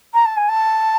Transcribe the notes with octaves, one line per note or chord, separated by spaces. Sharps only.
A#5
A5
G#5
A5